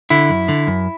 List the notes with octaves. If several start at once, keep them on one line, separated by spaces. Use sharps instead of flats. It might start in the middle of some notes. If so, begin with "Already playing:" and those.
D3 E4
F#2
D3
F#2